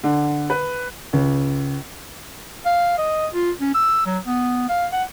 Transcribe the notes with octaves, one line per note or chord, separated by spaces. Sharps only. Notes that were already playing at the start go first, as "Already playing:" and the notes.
D3
B4
C#2
F5
D#5
F4
C#4
E6
F#3
B3
F5
F#5